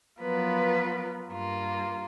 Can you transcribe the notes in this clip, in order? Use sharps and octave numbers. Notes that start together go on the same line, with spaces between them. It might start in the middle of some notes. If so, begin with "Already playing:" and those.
F3 F#3 B3 F4 A#4 B4
G2 A#3 F4